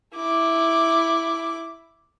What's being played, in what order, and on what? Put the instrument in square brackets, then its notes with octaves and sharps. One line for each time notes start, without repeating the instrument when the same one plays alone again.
[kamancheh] E4 D6